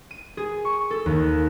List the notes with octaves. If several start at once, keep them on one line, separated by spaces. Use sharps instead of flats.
D#7
G#4
C#6
A4
D#2